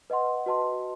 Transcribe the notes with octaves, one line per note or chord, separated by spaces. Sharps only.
B4 D#5 F#5 C6
F#4 B4 D#5 A5 C6